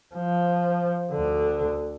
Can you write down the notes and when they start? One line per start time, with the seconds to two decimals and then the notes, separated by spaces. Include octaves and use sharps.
0.15 F3
1.12 D2 D3